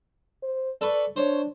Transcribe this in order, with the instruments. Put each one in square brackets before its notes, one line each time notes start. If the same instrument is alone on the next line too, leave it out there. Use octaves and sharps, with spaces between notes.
[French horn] C5
[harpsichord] A4 B4 C#6 [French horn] D5
[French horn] D4 [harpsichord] C5 C#5